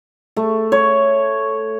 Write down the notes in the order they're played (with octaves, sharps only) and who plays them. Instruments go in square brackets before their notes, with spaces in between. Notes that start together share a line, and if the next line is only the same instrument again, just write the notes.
[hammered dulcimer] A3
C#5